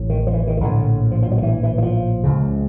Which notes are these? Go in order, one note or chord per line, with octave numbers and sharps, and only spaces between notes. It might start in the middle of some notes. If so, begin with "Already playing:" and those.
Already playing: A1 A2
D#3
F3
E3
D#3
D#3
A#1 A2 D3
F3
F3
F#3
D#3
E3
E3
E3
F3
C#2 C#3